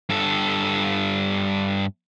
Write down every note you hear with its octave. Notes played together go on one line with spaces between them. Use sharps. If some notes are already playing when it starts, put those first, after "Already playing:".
G2 A4